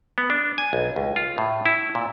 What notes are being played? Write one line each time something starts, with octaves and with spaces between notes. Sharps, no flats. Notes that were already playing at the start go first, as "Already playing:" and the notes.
B3
D4
G#5
B1
C#2
F4
A2
E4
A#2